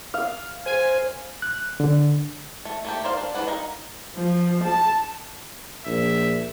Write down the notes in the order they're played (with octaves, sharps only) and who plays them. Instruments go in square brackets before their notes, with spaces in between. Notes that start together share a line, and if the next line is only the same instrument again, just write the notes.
[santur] F5
[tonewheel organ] C5 [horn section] G#5
[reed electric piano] F#6
D3
[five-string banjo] A3
A3 A#3 G4
A#4 C5 D5 F5
D4
E3 D4 F#4 B4 F#5
D#4 A#4 F5
[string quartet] F3
A5
[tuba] A#1 [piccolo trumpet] E5